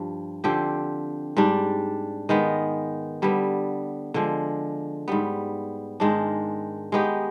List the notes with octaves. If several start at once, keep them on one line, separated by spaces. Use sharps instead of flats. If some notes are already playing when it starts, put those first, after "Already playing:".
Already playing: G2 F3
D3 F3 C4 G4
G#2 G3 D4
D#3 G#3 B3
D3 G3 B3
D3 F3 G#3
G#2 G3 B3
G#2 D#3 G#3 D4
G#3 B3 D#4 G4